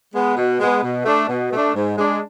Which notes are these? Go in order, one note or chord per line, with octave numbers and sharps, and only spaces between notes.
G#3 B3
B2
G#3 B3
B2
A3 D4
B2
A3 D4
G#2
G#3 D4